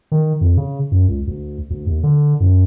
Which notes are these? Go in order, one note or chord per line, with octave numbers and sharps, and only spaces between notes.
D#3
F2
C#3
F#2
C#2
D2
D2
D#2
D3
F#2